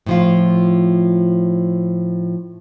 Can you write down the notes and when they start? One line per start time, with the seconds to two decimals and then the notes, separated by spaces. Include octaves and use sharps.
0.06 A2 F3 F4